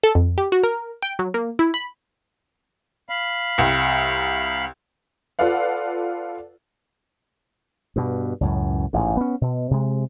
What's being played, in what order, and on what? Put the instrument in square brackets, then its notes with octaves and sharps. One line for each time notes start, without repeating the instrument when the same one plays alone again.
[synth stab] A4
F2
G4
F#4
A#4
G5
F#3
A#3
E4
B5
[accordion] F5 B5
[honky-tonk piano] C2
F4 A4 B4 D5 F5 F#5
[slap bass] G2 B2
C#2 F#2 A2
A1 G#2
B3 C#4
B2
C3 G#3